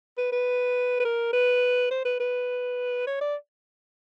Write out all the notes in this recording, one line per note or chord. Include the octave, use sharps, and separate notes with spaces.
B4
B4
B4
A#4
B4
C5
B4
B4
C#5
D5